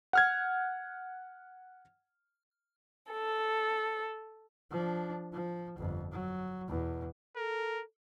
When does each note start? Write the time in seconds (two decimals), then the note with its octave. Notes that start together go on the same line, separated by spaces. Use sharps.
0.13 F#5 F6 G#6
3.10 A4
4.71 F3 D4
5.33 F3
5.78 G1 F2
6.12 F#3
6.68 E2 B2
7.36 A4 A#4